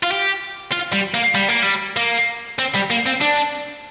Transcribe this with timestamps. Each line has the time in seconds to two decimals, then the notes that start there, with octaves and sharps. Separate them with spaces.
0.03 F4
0.11 G4
0.72 F4
0.93 G3
1.14 A#3
1.35 G3
1.48 A#3
1.63 G3
1.97 A#3
2.59 C4
2.75 G3
2.90 A#3
3.06 C4
3.21 D4